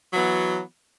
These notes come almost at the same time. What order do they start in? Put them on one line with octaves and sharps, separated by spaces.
F#3 E3 B3